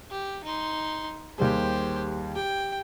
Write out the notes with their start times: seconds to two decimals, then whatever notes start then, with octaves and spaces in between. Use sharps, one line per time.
0.10 G4
0.44 D#4 C6
1.38 D#2 G3 G4 G#4 C5
2.35 G4 G5